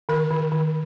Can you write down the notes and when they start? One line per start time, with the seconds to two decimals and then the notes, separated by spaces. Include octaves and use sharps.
0.09 D#3 A#4
0.31 D#3
0.52 D#3